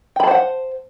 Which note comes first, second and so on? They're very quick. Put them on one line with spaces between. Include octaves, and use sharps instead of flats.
G5 B5 A5 C5 F#5